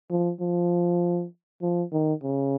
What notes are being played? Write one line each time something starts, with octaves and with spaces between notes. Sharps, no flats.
F3
F3
F3
D#3
C#3